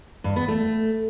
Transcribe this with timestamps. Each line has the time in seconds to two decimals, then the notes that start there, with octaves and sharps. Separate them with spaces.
0.24 G2
0.36 B3
0.48 A3